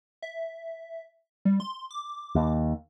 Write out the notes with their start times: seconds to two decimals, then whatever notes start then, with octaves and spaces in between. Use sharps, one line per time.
0.22 E5
1.45 G3
1.60 C6
1.91 D6
2.35 D#2